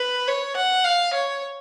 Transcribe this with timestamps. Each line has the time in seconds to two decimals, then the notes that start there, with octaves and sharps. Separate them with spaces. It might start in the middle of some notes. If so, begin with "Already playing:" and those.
Already playing: B4
0.28 C#5
0.56 F#5
0.84 F5
1.13 C#5